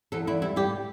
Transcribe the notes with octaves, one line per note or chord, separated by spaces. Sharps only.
E2 A4
E2 E4
G3 E4
G3 G4